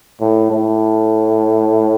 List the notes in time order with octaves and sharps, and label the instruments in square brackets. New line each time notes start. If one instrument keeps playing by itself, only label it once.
[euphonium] A2
A2